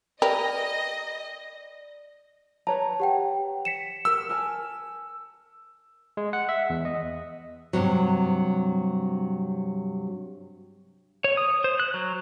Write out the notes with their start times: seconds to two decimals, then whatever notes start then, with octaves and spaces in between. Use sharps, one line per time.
0.22 G4 A#4 B4 D5 D#5
2.67 B4 C#5 A5 A#5
3.00 G4 F#5 G5
3.65 B6 C#7 E7
4.05 G4 A#4 E6
4.29 A#4 G#5 A5
6.17 G#3
6.33 F#5
6.49 E5
6.70 E2
6.85 D#5
7.73 G2 C3 F#3
11.24 C#5
11.37 D#6
11.64 C5
11.80 F#6
11.94 F#3